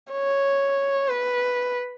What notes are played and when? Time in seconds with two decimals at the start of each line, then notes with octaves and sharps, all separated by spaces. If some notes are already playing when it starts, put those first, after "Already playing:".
0.12 C#5
1.09 B4